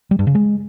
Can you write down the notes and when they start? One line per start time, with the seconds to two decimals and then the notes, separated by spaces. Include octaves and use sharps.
0.11 G3
0.19 G2
0.27 C#3
0.35 G#3